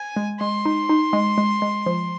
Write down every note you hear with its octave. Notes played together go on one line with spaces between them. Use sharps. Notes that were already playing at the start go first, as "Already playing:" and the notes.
Already playing: G#5
G#3
G#3 C6
D#4
D#4
G#3
G#3
G#3
F3